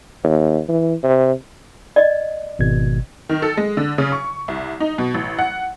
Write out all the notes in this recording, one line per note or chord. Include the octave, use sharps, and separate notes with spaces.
D#2
E3
C3
D5 D#5
G#1 B2 G#6
D#3
A4
G#3
D3
C#3
C#6
C2
D#4
B2
A1
F#5